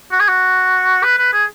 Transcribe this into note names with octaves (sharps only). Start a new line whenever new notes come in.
F#4
G#4
F#4
B4
B4
G#4